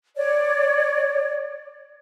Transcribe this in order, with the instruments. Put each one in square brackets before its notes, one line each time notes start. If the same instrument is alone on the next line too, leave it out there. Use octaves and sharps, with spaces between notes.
[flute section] C#5 D5